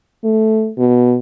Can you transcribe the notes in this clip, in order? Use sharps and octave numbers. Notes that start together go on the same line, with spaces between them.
A3
B2